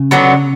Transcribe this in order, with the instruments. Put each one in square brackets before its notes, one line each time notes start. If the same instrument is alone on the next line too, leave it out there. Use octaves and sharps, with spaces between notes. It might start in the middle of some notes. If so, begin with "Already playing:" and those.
Already playing: [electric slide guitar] C#3
[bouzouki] D3 F#3 B3